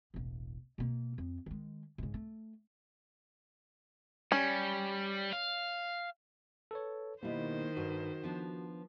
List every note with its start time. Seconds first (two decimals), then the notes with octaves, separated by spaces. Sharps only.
0.14 E1 A1
0.78 B2 A#3
1.18 F2
1.46 D#3 G#3
1.98 G#2 C#3
2.14 A3
4.32 G3 C#4
5.33 F5
6.71 A4 B4 C#5
7.23 B2 D#3 G3 A#3 E4 C5
7.77 G2 F#4
8.24 F3 B3 D4